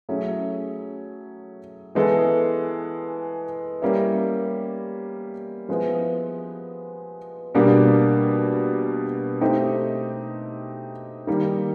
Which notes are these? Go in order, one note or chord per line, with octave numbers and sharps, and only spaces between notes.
F#3 A3 C#4 E4 G#4
E3 G#3 B3 E4 A4
G3 A#3 C#4 E4
F3 G#3 B3 E4
B2 G3 A#3 D4
A3 C4 D#4 G4
D#3 G3 A#3